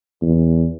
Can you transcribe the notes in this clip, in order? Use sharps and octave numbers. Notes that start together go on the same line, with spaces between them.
E2